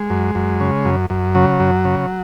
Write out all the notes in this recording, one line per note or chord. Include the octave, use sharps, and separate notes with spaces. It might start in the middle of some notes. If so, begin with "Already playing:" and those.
Already playing: G#3
F#2
F#2
C#3
F#2
F#2
C#3 F#3
F#2
C#3